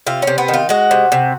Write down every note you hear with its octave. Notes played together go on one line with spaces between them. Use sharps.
C3 F4
C#4
C3
B3
D#3
F4
G#3 F#4
C3
C3